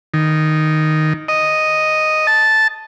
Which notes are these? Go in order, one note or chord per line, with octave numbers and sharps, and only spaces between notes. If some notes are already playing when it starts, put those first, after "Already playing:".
D#3
D#5
A5